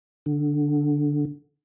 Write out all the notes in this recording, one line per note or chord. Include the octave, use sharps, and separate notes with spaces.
D3